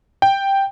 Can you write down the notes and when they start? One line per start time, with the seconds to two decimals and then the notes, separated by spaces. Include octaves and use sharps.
0.22 G5